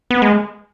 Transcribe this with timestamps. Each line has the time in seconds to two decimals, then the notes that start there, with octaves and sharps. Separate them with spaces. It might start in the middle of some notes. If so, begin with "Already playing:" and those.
0.11 B3
0.22 G#3